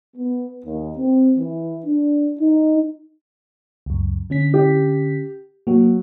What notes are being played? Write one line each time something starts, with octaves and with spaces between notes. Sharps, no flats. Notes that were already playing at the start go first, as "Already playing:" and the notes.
B3
D#2
C4
E3
D4
D#4
C#2 F#2
D3 C#4 B6
G4
F#3 A#3